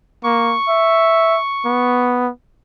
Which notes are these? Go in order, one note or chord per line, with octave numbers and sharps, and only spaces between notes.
A#3 C#6
E5
B3